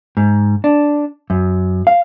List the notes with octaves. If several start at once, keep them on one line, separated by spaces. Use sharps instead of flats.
G#2
D4
F#2
F5